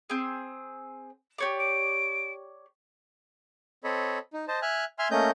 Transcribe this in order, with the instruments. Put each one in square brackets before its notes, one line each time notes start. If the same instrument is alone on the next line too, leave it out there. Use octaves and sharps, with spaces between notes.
[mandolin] C4 G#4
G4 C#5 D5
[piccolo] D7
[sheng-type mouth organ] C4 A4 C#5 D#5 B5
D#4
C5 D#5 A5
E5 G#5 F6 F#6
E5 G#5 C6 F6
A3 A#3 C#4 D#5 G6